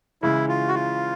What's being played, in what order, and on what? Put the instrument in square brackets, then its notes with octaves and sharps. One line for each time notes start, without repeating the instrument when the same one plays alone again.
[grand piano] C#3 E3 G#3 [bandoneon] E4
[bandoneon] F4
F#4
F4